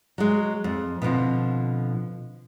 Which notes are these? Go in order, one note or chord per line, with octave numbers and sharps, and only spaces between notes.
F#3 G#3
F2
B2 D3 F3 C4